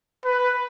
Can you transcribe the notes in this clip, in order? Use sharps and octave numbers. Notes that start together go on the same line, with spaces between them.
B4